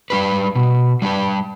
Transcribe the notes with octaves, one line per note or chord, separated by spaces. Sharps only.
G3 D4 G4 B4
B2
G3 D4 G4 B4